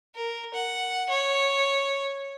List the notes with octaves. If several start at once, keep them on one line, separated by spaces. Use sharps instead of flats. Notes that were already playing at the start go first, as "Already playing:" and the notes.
A#4
F#5
C#5